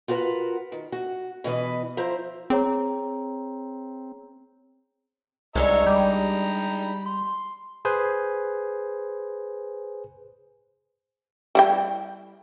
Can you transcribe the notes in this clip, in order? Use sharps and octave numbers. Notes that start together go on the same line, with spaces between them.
F4 F#4 A#4 B4 F#5
D#3
F#4
B2 E3 B4 D#5
F3 E4 C5 A#5
C4 G#4 C#5 A#5
C2 G#3 D4 D#4 C#5 E5 A#5
G3 G5 A#5 B5
C6
G#4 B4 C5 G#5
G3 E4 G5